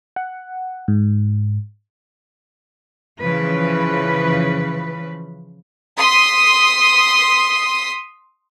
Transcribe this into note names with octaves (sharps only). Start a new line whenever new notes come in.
F#5
G#2
C#3 E3 F3 B4
C6 D#6 B6